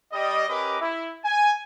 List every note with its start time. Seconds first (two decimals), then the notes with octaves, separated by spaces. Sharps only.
0.12 G3 D#5
0.47 C#4 G4 A#4 B4 D#5 D6
0.80 E4
1.24 G#5